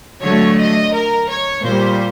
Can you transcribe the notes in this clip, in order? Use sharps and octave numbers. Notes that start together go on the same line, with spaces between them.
D3 F#3 A3 C#5
D#5
A#4
C#5
A#2 G3 C5